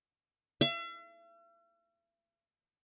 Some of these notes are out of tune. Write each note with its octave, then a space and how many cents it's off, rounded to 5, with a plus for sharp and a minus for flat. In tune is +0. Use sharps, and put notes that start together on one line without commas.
E5 +45